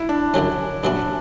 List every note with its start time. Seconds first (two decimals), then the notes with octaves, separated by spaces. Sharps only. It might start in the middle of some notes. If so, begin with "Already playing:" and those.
Already playing: E4
0.09 D4
0.34 F#2 D3 F#3 C#4
0.83 A#2 F#3 C#4 D4 E4